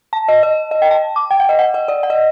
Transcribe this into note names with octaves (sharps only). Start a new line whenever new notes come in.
A5
D#5
D#5
D#5
G5
A5
D6
G5
F#5
D#5
F#5
D#5
D5
F#5
D#5